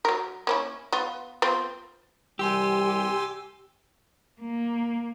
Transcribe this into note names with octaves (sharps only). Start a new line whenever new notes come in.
F#3 A#4
A#3 C#4 E4
B3 F4
B3 C4 F4
C2 E3 G3 G4 G#5 C6 E6
A#3